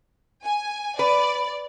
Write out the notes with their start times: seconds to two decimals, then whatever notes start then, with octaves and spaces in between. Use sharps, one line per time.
0.45 G#5
0.99 B4 D5